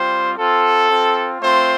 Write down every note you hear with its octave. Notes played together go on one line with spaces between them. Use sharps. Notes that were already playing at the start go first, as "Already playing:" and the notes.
Already playing: G3 C4 F4 C5
C4 F4 A4
C4 F4
A3 C4 F4 C5